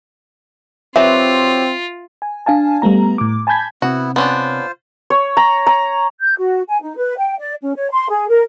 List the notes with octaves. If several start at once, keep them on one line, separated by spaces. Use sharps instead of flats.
F#3 C4 F4 G4 B4 E5
G#5
D4 F5 G#5 A5
G3 A3 B3 A#5
A2 D6
G#5 A5 B5 G6 G#6 B6
C3 B3 C4 E4 F#4
B3 C#4 D4 F4 C5
C#5
A#5
A#5
G6
F#4
G#5
D#4
B4
G5
D5
C#4
C#5
C6
G#4
A#4